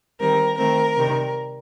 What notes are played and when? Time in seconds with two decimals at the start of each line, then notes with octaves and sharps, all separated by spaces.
0.20 D#3 G3 C4 A#4
0.58 D#3 A3 C4 A#4
0.96 C3 D#3 G3